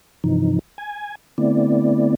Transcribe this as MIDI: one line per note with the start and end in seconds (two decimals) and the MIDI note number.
0.24 0.59 43
0.24 0.59 48
0.24 0.59 52
0.24 0.59 53
0.24 0.59 63
0.78 1.15 80
0.78 1.15 92
1.38 2.15 50
1.38 2.15 57
1.38 2.15 59
1.38 2.15 60
1.38 2.15 64
1.38 2.15 74